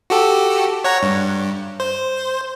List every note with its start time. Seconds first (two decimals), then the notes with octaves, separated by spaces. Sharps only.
0.10 F#4 G4 A4
0.84 C#5 F#5 A#5
1.03 G2
1.80 C5